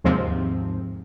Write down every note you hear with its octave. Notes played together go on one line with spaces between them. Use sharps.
D#2 G#2 C3 F3 C4